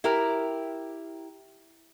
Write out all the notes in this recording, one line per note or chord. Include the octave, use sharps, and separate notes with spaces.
E4 G4 A#4